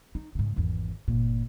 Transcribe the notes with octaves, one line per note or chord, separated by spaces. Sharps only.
D#4
G#2 C#3
G#1 E2
G1 A#2